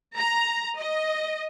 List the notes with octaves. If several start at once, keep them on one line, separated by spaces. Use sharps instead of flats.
A#5
D#5